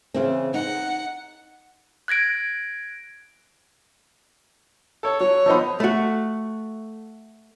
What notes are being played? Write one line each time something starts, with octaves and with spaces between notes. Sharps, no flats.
C#3 E3 C4
D#4 F#5
F#6 G#6 A#6 D7
A4 C#5
F#3 C#5
F3 B3 D#4 A4 C5
A3 F#4